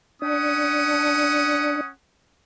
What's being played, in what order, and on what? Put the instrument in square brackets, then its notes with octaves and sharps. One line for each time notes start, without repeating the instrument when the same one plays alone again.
[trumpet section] C#4 F#5 D#6 [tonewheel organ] D4